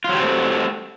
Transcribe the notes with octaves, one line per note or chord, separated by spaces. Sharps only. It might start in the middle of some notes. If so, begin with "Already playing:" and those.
F#3 A3 C4 F4 G4